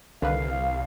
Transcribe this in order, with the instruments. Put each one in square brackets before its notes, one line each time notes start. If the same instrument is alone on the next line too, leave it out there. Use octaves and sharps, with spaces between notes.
[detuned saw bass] C2 [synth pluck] D3 D#3 B4 [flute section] F5